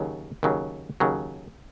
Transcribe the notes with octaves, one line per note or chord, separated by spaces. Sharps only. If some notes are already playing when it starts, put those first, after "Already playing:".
Already playing: D#2 C#3 F#3
D#2 C#3 F#3
D#2 C#3 F#3